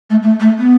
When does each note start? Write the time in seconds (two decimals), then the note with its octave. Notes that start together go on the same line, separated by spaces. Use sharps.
0.10 A3
0.22 A3
0.39 A3
0.58 B3